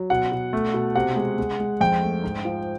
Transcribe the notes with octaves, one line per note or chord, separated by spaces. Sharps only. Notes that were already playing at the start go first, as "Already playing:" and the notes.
Already playing: F#3
B2 F#5
B2
A3
B2
C3 F#5
G#3
G#3
G#3
F2 G5
A3
G#2
F3